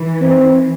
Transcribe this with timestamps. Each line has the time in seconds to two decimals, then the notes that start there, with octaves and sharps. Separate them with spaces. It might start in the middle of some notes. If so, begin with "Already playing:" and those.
Already playing: E3
0.21 C4